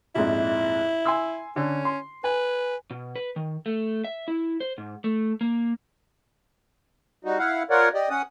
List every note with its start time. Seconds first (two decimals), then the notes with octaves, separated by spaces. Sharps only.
0.15 A#1 F2 G#2 E4
1.05 G#5 C6 E6
1.56 D3 C#4
1.85 C6
2.24 B4 G#5
2.90 B2
3.16 B4
3.36 D#3
3.66 A3
4.04 E5
4.28 E4
4.60 C5
4.78 G#2
5.04 A3
5.41 A#3
7.25 G3 D#4 F#4
7.38 E4 F5 F#5
7.70 F4 A#4 C#5 D5 F#5
7.94 G4 D5 D#5
8.10 C#4 F#5 D#6